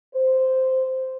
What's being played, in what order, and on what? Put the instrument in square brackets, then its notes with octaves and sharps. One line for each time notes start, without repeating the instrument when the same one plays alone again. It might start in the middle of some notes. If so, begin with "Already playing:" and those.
[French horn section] C5